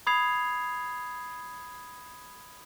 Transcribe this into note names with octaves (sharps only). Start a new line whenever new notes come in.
B5 D#6 G#6 C7 F7